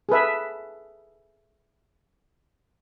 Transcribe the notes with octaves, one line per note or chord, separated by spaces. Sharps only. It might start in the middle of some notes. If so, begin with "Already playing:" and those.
G#4 A4 B4 E5